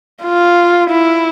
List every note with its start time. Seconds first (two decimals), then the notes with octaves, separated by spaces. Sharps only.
0.23 F4
0.90 E4